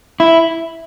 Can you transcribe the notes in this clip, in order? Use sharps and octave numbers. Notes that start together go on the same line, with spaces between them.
E4